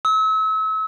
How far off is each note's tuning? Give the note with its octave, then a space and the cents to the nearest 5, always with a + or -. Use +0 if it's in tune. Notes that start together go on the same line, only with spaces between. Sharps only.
E6 -35